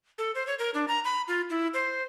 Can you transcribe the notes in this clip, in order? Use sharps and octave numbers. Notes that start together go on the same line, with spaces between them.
A4
C5
C#5
A#4
D4
A#5
B5
F4
E4
C5